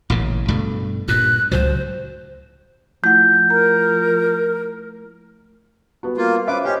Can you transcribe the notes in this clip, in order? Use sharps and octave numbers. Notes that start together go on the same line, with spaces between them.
A1 A#2 C#3
G2 B2 A3
G2 A#2 F#6
C#2 A2 F#3 C5
F3 A3 E4 F#5 G6
A#4 A#5
G3 B3 F#4
A#3 F4
C#4 B4 C5 E5 D6
C#4 G4 C5 D#5